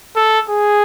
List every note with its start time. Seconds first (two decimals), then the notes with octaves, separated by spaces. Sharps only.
0.16 A4
0.50 G#4